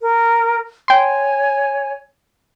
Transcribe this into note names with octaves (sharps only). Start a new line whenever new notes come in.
A#4
C#5 G5 G#5 C6